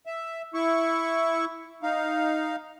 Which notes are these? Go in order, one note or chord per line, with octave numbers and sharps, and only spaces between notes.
E5
E4 C#6
D#4 F5